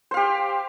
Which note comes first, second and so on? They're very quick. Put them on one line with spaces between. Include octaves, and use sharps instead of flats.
C5 F5 G4